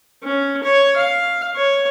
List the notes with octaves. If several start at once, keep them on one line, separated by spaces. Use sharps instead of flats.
C#4
C#5
F5
C#5